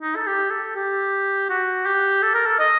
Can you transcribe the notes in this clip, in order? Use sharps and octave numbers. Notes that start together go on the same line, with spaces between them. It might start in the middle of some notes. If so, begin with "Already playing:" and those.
D#4
A4
G4
A4
G4
F#4
G4
A4
A#4
A4
D#5